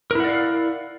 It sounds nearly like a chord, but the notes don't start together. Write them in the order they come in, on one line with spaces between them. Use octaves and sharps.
A#4 E4 F#5 D5 F5